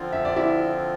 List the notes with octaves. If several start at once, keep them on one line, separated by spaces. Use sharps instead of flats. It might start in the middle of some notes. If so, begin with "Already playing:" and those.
Already playing: D3 F3 C4 F4
E5
D5
E4 E5